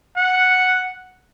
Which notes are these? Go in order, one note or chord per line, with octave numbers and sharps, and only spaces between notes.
F#5